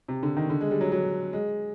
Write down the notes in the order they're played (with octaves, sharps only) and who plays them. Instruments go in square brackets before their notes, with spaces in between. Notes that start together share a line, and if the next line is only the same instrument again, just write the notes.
[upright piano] C3
D3
D#3
D3
G#3
G3
F#3
F#3
G#3